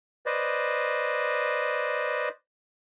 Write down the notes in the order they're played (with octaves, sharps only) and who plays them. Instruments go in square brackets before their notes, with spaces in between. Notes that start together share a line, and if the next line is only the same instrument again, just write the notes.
[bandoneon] B4 C5 D5 D#5